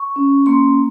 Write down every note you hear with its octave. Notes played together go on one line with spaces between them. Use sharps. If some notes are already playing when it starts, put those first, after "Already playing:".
Already playing: C#6
C#4
A#3 C6